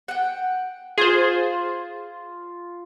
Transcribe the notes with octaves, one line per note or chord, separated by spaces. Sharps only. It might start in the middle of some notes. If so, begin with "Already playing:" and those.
F#5 G5
F4 G#4 C5